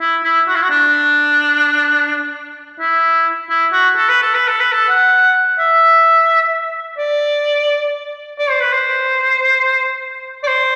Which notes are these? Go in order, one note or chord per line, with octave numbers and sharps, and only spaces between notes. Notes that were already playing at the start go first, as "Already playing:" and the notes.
E4
E4
F#4
E4
F#4
D4
E4
E4
F#4
A4
B4
A4
B4
A4
B4
A4
F#5
E5
D5
D5
C5
B4
C5
D5
C5